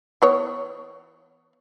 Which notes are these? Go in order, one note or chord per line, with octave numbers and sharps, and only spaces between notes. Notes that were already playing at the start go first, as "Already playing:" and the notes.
E3 B3 C#5